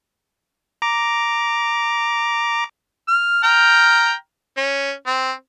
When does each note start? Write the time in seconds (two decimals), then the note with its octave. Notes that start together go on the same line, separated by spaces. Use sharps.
0.82 A#5 D6
3.08 F6
3.43 G5 A#5 F6
4.57 C#4
5.07 C4